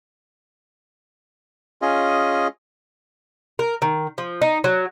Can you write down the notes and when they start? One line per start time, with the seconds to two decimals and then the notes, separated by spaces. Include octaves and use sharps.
1.82 C#4 F4 G#4 D#5
3.59 A#4
3.82 D#3
4.18 F3
4.42 D#4
4.64 F#3